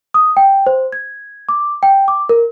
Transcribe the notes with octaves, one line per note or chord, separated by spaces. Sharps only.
D#6
G5
C5
G#6
D6
G5
D6
A#4